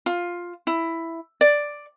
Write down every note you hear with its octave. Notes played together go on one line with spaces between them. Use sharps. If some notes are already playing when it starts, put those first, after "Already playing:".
F4
E4
D5